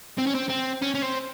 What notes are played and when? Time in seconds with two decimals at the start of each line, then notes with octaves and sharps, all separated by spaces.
0.18 C4
0.27 C#4
0.35 C4
0.49 C4
0.82 C#4
0.95 C#4
1.03 C4